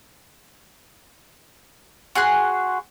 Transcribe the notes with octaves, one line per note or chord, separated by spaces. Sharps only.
F#4 G#4 C6 F#6